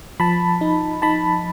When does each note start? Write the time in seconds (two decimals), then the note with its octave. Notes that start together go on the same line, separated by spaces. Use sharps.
0.20 F3 A5 B5
0.61 D#4
1.02 D#4 A5 B5